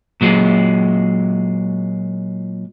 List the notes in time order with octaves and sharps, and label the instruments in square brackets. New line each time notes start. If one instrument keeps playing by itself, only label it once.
[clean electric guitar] A#2 F#3 G#3